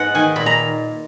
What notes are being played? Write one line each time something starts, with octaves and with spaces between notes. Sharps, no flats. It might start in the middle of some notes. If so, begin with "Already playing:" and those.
Already playing: G#2 G#3 B4 F#5
D#3 G#5
A#2 B5
A#5